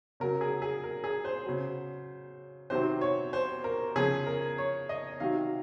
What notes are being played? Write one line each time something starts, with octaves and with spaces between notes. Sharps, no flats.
C#3 F#3 A#4
G#4
G#4
A#4
G#4
C5
C#3 F#3
C3 D#3 F#3 C5
C#5
C5
A#4
C#3 F3 G#4
A#4
C#5
D#5
C3 D#3 F#3 F5